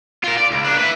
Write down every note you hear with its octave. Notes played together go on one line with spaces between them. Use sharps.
F4 A#4
D5
C#2
A#3 D4
B4 E5